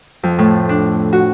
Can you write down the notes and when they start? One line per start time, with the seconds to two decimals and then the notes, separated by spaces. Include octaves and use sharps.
0.23 F2
0.39 A2
0.69 D4
1.13 F#4